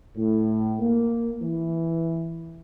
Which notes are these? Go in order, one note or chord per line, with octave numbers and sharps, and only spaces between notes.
A2
A#3
E3